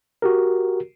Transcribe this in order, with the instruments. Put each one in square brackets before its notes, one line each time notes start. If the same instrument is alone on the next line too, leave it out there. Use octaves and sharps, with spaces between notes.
[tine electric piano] F#4 G4 A#4